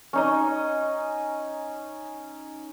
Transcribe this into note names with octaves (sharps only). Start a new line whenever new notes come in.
C#4 D#4 D#5